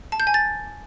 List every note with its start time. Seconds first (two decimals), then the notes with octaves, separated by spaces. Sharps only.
0.12 A5
0.20 G6
0.27 G#5
0.34 A6